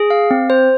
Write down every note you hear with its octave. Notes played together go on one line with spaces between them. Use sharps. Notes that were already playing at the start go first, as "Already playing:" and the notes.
Already playing: G#4
F5
C4
C5